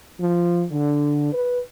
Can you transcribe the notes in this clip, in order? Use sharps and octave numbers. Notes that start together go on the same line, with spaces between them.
F3
D3
B4